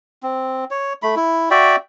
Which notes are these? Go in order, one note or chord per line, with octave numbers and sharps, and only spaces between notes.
C4
C#5
A3 B5
E4
F#4 D5 E5 G5